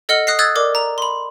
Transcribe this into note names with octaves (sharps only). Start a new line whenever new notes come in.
A4 D#5 F#5 F6 G7
D#6 F#6 A#6 C7
D#6 E6 F#6 G#6 A6
A#4 D5 D6
A#5 F7
B5 C6